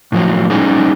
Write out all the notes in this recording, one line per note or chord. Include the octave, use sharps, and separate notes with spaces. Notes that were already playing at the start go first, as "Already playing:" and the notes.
A2 F3 F#3
G3 C#4 D#4 G#4